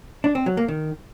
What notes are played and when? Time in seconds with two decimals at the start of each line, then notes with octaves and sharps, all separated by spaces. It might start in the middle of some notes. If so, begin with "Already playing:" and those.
0.24 D4
0.35 C4
0.46 F#3
0.57 A#3
0.68 D#3